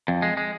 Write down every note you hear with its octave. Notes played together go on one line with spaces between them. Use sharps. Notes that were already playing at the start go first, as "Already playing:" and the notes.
F2
G#3
G#3